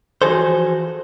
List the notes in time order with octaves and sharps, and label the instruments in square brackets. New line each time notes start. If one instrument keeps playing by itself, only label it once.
[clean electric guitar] E3 F3 F#4 G#4 A4 C5